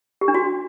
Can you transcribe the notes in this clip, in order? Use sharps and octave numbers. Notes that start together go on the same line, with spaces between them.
G4
D4
F#4